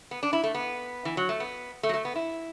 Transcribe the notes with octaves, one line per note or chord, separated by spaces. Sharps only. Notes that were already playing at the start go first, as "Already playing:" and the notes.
B3
D4
E4
A3
B3
E3
F#3
A3
B3
A3
F#3
A3
B3
E4